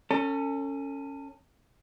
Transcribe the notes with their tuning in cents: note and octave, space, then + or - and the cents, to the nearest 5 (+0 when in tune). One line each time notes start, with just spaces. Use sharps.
C#4 +0 A4 +35